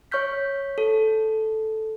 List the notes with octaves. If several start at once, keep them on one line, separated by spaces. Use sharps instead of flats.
C#5 C#6 F6 G6 B6
A4